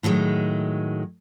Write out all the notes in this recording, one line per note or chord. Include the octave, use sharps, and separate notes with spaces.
A2 D#3 F#3 G#3